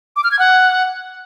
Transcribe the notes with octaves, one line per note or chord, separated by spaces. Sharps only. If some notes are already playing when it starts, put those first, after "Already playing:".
D6
F6
G#6
F#5